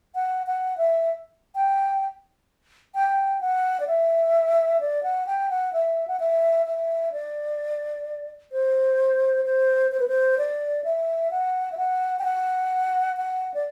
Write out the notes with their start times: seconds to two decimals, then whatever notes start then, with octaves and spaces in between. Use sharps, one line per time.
0.15 F#5
0.47 F#5
0.78 E5
1.55 G5
2.95 G5
3.41 F#5
3.80 D5
3.87 E5
4.80 D5
5.03 F#5
5.27 G5
5.50 F#5
5.73 E5
6.08 F#5
6.20 E5
6.66 E5
7.12 D5
8.52 C5
9.45 C5
9.92 C5
10.00 B4
10.08 C5
10.38 D5
10.84 E5
11.31 F#5
11.72 E5
11.77 F#5
12.19 G5
12.24 F#5
13.17 F#5
13.54 D5